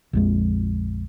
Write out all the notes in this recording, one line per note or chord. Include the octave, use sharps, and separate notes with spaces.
A#1 F2 G#3